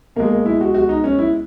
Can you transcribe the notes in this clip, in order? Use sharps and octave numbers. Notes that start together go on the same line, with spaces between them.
B2 G#3 A#3
A#3
E4
F#4
F#4
D#4
C#4
E4